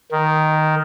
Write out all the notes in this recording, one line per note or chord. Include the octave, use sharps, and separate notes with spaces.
D#3